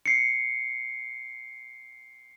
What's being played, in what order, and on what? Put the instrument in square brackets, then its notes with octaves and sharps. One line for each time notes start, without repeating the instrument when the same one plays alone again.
[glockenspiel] C7 C#7